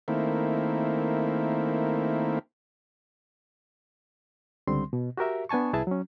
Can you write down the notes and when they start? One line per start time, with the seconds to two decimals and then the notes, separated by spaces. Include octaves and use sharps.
0.08 D#3 A3 A#3 C4 E4
4.67 C#2 D3 G3 C4 C6
4.93 B2
5.17 F#4 G4 A#4 E5
5.49 B3 D4 G#5 A5 C#6
5.73 C2 E4 G#4 B4 E5 A5
5.87 F#3 C#4